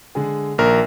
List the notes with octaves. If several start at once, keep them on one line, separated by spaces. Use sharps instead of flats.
D3 G#3 G#4
A#1 D#3 A#3 A#4